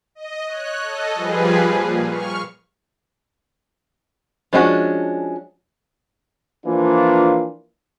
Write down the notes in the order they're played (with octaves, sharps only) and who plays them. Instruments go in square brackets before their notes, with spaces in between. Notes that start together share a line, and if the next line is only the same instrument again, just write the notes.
[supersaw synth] D#5
C#5 F#6
A4 D#5
F3 G3 G#4 B4
A#2
C#6 F6
[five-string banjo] F3 G#3 C#4 D4 F#4
[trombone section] E3 F3 A#3 D4 F4